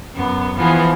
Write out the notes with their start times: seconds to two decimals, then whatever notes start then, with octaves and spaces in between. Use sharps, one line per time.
0.14 F#2 B3
0.57 E3 F3 B3 G#4